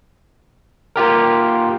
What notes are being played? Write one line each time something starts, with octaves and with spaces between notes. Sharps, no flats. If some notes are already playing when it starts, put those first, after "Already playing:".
A#3 F4 G4 A#4